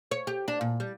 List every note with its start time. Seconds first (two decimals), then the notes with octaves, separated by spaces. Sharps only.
0.11 C#5
0.27 G4
0.48 D4
0.61 A#2
0.80 G3